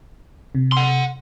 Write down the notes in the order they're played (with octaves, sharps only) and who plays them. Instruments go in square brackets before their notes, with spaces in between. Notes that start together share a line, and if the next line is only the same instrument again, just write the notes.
[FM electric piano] C3
[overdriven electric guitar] F#5 C6